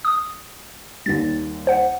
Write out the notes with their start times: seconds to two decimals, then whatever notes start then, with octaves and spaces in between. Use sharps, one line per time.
0.05 D#6
1.06 D#2 D#3 G3 A6
1.67 C5 F#5